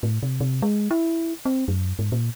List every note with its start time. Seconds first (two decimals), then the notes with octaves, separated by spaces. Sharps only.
0.03 A2
0.23 C3
0.41 C3
0.62 G#3
0.91 E4
1.45 C4
1.68 F#2
1.99 G#2
2.12 A#2